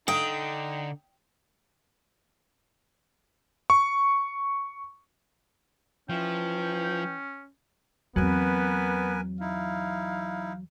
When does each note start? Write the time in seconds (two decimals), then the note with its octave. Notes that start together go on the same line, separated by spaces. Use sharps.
0.08 D3 D#4 F5 G5 D#6 E6
3.70 C#6
6.09 E3 F3 C#4 G5
8.16 E2 F#3 B3 C4 A#4 B4 G#5
9.41 D#4 E4 F5